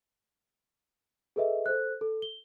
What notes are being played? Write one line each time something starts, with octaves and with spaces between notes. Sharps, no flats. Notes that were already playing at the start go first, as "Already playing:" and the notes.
G#4 A4 B4 D#5 E5
A4 C5 F#6
A4
G7